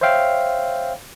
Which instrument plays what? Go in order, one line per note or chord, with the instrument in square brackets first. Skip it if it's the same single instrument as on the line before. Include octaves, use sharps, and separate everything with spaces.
[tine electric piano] C5 C#5 E5 F5 G5